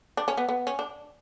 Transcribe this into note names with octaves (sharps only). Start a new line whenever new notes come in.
D4
C#4
B3
B3
C#4
D4